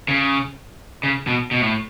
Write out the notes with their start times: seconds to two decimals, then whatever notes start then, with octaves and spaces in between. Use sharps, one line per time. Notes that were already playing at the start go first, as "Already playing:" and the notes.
0.08 C#3
1.03 C#3
1.27 B2
1.51 B2
1.62 A2